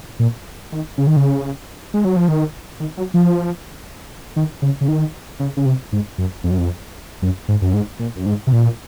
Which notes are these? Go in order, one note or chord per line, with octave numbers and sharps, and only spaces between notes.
A#2
D#3
C#3
D#3
C#3
G#3
F#3
F3
D#3
D#3
F#3
F3
D#3
C#3
C#3
D#3
C#3
C#3
C3
G#2
F#2
F2
F#2
F2
F#2
G#2
F#2
G#2
A#2
F#2
G#2
C3
A#2